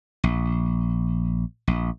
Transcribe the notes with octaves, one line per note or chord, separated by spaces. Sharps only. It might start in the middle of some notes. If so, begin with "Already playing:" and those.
A#1
A#1